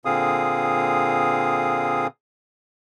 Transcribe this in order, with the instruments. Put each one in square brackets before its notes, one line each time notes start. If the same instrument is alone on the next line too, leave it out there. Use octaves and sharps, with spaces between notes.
[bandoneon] A#2 D3 C4 G#4 F5 D#6